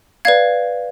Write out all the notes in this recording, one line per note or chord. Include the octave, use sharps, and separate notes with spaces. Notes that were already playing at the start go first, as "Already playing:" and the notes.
B4 D5 F5 G#6